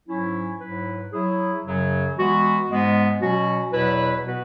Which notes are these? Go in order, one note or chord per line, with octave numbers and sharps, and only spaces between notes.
G#2 F#3 C#4 E4
G#2 F#3 E4 B4
F#3 E4 G#4
F#2 C#3 F#3
E3 G#3 B3 F#4
G#2 G#3 B3
B2 F#3 C#4 F#4
E2 B2 F#3 E4 B4
B2 B3 F#4 B4